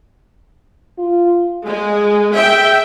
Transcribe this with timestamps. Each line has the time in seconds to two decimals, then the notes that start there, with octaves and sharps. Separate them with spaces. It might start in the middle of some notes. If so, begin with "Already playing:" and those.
0.99 F4
1.64 G#3 G#4
2.34 E5 G5